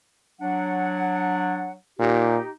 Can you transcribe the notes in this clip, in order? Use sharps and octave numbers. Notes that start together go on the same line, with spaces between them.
F#3 D4 F#5
A#2 D#4 G4